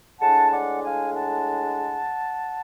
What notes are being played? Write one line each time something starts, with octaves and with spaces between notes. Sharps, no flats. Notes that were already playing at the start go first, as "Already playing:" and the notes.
A2 G#3 D4 F#5 A5
D5 F#5
F5 G#5
F#5 A5